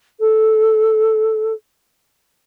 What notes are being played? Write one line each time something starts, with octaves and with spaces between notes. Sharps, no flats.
A4